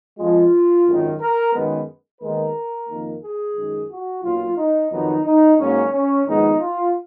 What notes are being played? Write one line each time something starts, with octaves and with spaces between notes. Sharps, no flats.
F2 F3 G#3 F4
G#1 F#2 D#3
A#4
F#2 D#3 G#3 B3
D#2 D#3 G#3 B3 A#4
F2 D#3 A#3
G#4
F#2 D#3 G#3
F#4
B1 A#2 F#3 F4
D#4
F2 D#3 F#3 B3 D#4
D#4
G#2 F#3 A#3 C#4
C#4
A#1 G#2 D#3 G#3 B3 D#4
F4